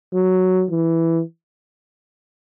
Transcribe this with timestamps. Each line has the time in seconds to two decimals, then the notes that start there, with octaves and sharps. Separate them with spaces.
0.14 F#3
0.71 E3